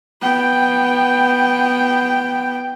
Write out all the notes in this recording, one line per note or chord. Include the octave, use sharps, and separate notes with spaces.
B3 G5